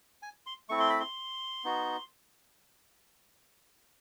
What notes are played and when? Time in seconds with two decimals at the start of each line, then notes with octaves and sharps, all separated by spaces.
0.22 G#5
0.46 C6
0.69 A3 C4 E4 C#6
0.80 C6
0.89 B5
1.00 C6
1.64 B3 D#4 F#4